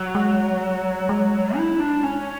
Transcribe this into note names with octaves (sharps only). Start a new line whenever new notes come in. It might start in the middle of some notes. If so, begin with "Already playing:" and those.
Already playing: F#3
G#3
G#3
E4
D4
C#4